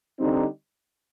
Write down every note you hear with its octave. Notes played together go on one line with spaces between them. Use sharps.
D3 G3 C4 D#4